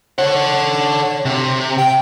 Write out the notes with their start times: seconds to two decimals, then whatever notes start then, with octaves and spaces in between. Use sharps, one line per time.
0.19 A4 C#5 F#5
1.25 C3
1.78 G5